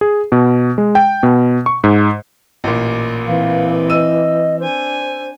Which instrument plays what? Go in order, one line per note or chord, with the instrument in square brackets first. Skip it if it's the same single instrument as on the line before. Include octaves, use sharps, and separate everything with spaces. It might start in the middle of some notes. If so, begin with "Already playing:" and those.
[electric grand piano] G#4
B2
G#3
G5
B2
C#6
G#2
[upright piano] A1 A#2
[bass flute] E3 [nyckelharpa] C4 B4 [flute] F5
[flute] D#5 [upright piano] E6 D#7
[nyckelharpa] D4 G#5 [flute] C5